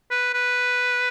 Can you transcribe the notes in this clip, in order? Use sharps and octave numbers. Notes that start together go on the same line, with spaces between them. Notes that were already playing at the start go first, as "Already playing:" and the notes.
B4
B4